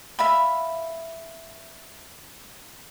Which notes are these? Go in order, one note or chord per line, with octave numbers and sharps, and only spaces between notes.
E5 F5 B5